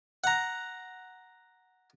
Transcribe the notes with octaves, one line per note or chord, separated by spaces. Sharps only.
F#5 A#5